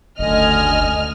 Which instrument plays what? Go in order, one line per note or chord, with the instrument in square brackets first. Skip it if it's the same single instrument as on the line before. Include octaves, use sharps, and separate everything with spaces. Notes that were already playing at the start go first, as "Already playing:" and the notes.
[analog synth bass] F#1 [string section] D2 F6 [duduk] D3 [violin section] D#5 G#5